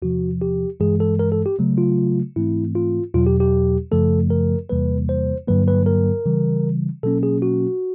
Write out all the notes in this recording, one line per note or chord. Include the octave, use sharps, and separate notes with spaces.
E2 C3 F3 F#4
G4
G2 E3 G#3 G#4
A4
A#4
A4
G4
C#3 F#3 A3
F4
G#2 E3 A3 C4 E4
F4
E2 B2 F#3 F4
G4
G4
F#2 C#3 F3 A3 A4
A#4
E2 C3 E3 G3 A#3 B4
C5
G2 D3 F#3 A#3 B4
B4
A#4
C#3 E3 G3
B2 F#3 A#3 C#4 A4
G#4
F#4